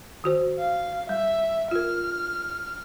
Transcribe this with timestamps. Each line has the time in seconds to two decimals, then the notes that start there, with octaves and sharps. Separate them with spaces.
0.24 D#3 F#4 C5
0.59 F5
1.09 G3 E5
1.71 F4 A#4 F6